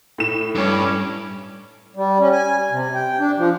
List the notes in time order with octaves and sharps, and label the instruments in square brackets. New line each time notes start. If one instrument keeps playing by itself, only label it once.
[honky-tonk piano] A2 E7
[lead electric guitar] G2 [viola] C#4 D6
[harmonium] G3
C#4
G#5
C3
G5
D4
F3